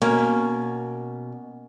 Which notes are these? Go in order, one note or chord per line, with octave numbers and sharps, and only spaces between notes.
B2 A#3 C#4